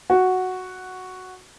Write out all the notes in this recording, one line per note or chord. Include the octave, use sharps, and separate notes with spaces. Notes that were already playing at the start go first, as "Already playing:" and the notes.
F#4